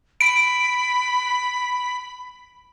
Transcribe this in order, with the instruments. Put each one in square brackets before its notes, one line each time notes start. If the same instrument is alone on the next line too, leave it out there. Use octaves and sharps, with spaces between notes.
[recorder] B5 [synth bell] D7